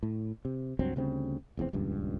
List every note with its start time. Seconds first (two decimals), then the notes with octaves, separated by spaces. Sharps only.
0.03 A2
0.45 C3
0.79 C#2 G2 F#3 C4
0.96 D2 C#3 G3 C4
1.57 F1 E2 G#2 C4
1.73 D#1 C#2 G2